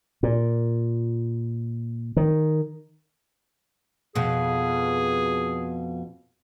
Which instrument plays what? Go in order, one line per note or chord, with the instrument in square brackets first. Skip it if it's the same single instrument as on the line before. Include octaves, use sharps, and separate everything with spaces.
[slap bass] A#2
D#3
[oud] F2 B2 [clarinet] G#4